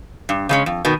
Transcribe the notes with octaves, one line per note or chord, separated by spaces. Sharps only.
G2
C#3 G#3 C#4
F2
B2 D#3